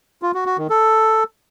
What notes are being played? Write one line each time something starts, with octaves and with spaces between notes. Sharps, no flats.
F4
F#4
F#4
D#3
A4